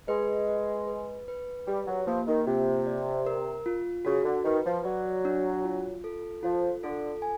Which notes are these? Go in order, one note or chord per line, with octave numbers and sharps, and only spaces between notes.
G#3 B4
B4
B4
B4
G3 G4
F#3
F3 A#3
D#3
C3 F4
D5
A#4
F4
C#3 F#4
D3
D#3 B4
F3
F#3 D5
D4
F4
A4
F3 F4
D3 A4
G#5